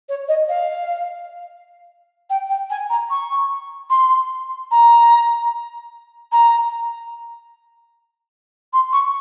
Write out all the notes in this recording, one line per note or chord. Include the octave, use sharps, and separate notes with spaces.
C#5
D#5
F5
G5
G5
G#5
A#5
C#6
C6
A#5
A#5
C6
C#6